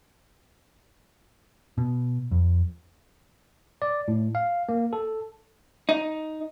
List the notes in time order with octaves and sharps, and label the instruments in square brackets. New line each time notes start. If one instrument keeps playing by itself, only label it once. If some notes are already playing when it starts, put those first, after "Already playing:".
[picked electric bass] B2
F2
[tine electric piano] D5
A2
F5
A#3
A4
[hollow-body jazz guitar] D#4